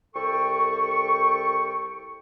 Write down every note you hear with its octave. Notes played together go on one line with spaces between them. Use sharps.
C2 A4 G5 C#6